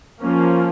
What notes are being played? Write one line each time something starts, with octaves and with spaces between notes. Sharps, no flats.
F3 A#3 C#4